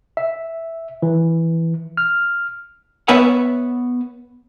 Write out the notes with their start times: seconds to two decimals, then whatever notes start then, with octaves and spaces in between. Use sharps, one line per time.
0.17 E5
1.02 E3
1.97 F6
3.08 B3 B4 C#5 E5 F#5